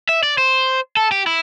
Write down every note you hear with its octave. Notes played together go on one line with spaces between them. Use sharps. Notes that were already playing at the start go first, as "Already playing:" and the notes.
E5
D5
C5
A4
G4
E4